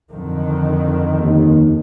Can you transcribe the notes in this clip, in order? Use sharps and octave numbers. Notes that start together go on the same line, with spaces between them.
F2 D3 D#3
D#2